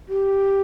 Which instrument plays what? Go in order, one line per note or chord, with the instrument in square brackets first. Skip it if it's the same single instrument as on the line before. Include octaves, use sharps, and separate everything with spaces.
[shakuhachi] G4